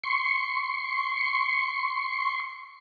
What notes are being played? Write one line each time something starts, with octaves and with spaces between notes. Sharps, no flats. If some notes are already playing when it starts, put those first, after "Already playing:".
C6 C#6